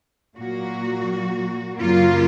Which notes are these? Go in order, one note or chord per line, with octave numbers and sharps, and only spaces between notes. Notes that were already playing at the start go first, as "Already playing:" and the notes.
A#2 F#3 A#3 F#4
F#2 C#3 F#3 A#3 F4